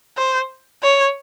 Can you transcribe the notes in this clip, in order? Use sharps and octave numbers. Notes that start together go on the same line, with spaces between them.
C5
C#5